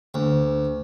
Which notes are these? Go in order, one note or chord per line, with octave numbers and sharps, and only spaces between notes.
D2